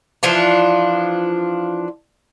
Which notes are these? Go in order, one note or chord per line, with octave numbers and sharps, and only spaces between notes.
E3 F3 D4 F4